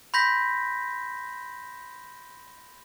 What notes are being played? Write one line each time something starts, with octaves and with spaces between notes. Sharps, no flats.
B5 C6 G6 A#6 B6